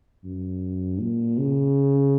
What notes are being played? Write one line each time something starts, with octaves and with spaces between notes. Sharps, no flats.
F#2
A#2
C#3